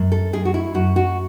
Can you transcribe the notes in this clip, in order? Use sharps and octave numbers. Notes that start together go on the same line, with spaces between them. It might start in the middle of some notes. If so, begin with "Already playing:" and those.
Already playing: F#2
A4
F#2 G#4
F#4
E4
F#2 F#4
F#4